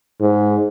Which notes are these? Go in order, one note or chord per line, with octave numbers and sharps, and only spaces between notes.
G#2